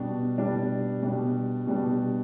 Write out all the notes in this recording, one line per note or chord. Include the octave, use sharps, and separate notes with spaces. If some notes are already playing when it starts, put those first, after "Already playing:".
Already playing: B2 G3 D4
B2 G3 D4
B2 G3 D4
B2 G3 D4